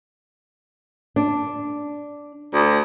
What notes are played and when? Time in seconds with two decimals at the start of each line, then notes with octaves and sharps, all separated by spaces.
1.16 D4
2.54 D2